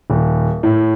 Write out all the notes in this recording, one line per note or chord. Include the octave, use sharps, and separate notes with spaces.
D#1
A2